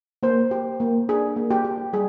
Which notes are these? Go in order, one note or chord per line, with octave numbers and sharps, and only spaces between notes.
A#3 C5
G4
A#3
D4 G#4
A#3
G4
G4
G3 G#4